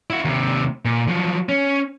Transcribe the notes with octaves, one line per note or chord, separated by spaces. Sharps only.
E4 F#4
D#2 C3
A#2
F3 F#3
C#4